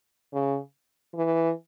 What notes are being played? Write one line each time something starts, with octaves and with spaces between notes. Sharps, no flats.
C#3
E3